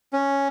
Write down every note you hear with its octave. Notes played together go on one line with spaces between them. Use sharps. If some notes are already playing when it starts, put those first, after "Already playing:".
C#4